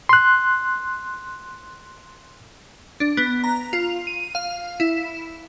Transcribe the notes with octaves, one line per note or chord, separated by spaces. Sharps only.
C6 F#6
D4
B3
A#5
F4
D#7
F5
E4